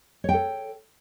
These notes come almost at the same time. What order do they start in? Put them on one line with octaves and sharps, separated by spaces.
C#5 G5 A4